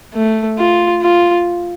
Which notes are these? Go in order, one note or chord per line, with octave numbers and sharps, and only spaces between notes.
A3
F4
F4